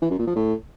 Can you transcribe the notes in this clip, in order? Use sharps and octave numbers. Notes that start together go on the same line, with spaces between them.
E3
F#2
A#2
F3
A2